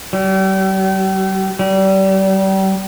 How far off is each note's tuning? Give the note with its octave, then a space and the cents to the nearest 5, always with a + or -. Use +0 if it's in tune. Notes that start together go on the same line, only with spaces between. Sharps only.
G3 -40
G3 -30